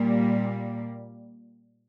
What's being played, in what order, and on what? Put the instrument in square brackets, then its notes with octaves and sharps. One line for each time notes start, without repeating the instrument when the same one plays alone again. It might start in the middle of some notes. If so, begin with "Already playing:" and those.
Already playing: [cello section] A#2 G3 A#3